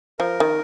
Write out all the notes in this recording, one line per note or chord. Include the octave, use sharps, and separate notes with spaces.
F3 A#4
D#3